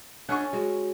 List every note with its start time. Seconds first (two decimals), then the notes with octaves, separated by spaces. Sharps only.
0.29 C#4 D4 A4 F#5 G#5 C#6
0.53 G#3 F#4